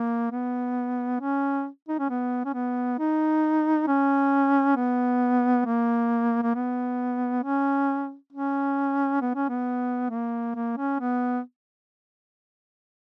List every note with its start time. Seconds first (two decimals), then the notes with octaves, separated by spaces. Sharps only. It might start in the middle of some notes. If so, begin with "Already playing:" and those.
Already playing: A#3
0.31 B3
1.20 C#4
1.88 D#4
1.99 C#4
2.09 B3
2.45 C#4
2.54 B3
2.98 D#4
3.87 C#4
4.76 B3
5.66 A#3
6.43 A#3
6.54 B3
7.43 C#4
8.32 C#4
9.21 B3
9.35 C#4
9.48 B3
10.10 A#3
10.55 A#3
10.77 C#4
10.99 B3